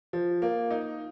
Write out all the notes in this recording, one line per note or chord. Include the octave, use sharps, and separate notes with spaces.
F3
A#3
D#4